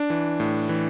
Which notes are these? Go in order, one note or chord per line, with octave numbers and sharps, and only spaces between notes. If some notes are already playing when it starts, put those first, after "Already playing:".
Already playing: D4
E3
A2
E3